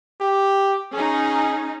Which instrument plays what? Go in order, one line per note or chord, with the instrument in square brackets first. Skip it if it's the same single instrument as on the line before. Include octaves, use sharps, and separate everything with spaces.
[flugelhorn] G4
[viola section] C#4 D#4 [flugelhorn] G#4